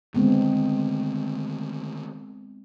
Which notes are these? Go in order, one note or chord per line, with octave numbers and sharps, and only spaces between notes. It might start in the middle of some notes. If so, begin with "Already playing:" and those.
D3 D#3 G#3 A3 B3 C4